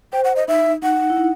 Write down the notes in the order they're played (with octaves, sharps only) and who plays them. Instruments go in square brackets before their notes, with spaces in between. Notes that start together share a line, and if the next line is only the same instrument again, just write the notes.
[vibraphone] C5 [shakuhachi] G5
[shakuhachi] F#5
D#5
[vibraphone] D#4 [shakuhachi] E5
[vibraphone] D#4 [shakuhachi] F#5
[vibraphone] E4
D#4